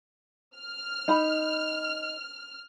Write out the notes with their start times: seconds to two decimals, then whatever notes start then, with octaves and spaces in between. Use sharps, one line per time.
0.56 F6
1.08 D#4 B5